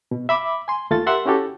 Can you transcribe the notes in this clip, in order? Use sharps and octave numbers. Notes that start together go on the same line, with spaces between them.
B2
E5 B5 D6
G#5 C6
D#2 A3 F4 A4 A6
G4 A#4 E5 F#5 C6 E6
C#4 E4 F#4 G4 A4